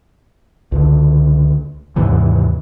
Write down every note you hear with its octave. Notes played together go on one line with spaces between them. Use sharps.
C#2 D3
D#2 G#2 C3 E3